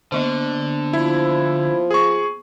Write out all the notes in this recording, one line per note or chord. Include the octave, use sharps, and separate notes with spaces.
D3 A#3 B3 C5
F3 E4
G#4 C#6